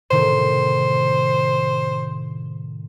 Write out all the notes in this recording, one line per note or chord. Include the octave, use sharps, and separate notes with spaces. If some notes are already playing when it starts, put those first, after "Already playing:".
A2 C3 D#3 C5